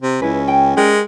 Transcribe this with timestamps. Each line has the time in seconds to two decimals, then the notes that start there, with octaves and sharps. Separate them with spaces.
0.02 C3
0.22 C#2 C#4 E4 B4
0.48 G5
0.77 G#3 G4 A#4 D5